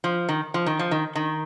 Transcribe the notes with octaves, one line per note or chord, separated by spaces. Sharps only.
F3
D#3
F3
D#3
F3
D#3
D#3